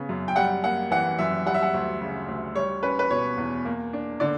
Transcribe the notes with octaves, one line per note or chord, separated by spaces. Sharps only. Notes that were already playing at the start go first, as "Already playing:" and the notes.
Already playing: C#3 B3
F#2
G5
G3 F#5
A#3 F#5
E3 F#5
F#2 E5
G3 F#5
E5
F#5
D2
C#3
D2
G3 C#5
C#4 B4
B4
B2 C#5
E2
A#3
D4
D3 D5